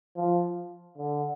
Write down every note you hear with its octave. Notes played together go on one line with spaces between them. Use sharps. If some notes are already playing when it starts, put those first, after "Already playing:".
F3
D3